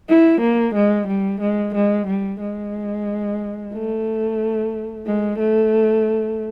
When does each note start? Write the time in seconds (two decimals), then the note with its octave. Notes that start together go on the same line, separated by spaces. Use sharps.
0.09 E4
0.41 A#3
0.75 G#3
1.08 G3
1.41 G#3
1.75 G#3
2.07 G3
2.41 G#3
3.73 A3
5.06 G#3
5.39 A3